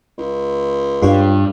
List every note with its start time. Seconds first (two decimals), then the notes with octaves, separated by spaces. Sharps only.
0.18 C#2
1.02 G2 F4 G4 C#5